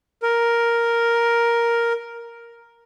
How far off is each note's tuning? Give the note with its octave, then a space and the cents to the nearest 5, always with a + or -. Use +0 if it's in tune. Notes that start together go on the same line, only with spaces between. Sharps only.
A#4 +5